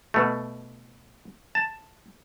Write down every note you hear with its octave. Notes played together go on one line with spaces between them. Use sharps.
B2 A3
A5